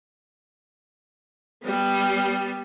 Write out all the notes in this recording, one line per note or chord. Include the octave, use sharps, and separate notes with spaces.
G3 B3